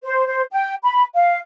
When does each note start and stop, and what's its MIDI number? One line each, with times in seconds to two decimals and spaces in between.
0.03 0.26 72
0.26 0.42 72
0.50 0.73 79
0.82 1.02 83
1.14 1.37 77